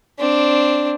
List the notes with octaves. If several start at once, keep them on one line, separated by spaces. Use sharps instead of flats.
C4 D4